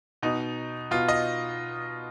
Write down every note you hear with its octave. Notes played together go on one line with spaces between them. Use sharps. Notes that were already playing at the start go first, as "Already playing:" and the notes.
B2 D#4
B2 F4
D#5